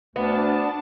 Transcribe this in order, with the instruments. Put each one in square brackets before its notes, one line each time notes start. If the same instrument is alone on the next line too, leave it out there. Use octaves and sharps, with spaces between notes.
[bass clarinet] D2 [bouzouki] B3 [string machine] D4 A5